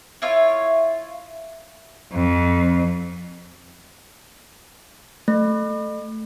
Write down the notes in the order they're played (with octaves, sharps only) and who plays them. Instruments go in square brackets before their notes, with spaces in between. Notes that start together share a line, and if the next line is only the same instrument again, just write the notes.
[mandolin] E4 F4 C#5
[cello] F2
[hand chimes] A3